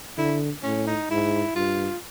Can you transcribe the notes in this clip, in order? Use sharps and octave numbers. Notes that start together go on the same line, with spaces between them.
D3 E4
A2 C#4
D#4
G#2 E4
G2 F4